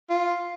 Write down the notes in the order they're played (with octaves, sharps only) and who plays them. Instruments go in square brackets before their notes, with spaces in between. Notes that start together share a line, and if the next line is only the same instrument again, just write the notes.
[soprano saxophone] F4